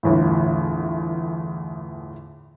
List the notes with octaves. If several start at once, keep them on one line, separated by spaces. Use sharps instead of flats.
G1 E2 A2